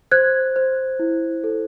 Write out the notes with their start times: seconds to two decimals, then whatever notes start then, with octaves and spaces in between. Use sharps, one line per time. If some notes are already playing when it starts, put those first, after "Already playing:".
0.11 C5 F#6 G#6
0.56 C5
0.99 E4
1.44 A4